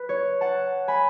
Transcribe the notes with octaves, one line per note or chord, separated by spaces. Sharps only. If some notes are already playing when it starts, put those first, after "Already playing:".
Already playing: B4
C#5
F#5 A5
G#5 B5